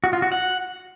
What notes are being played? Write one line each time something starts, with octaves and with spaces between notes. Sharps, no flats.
F#4
F4
F#4
F#5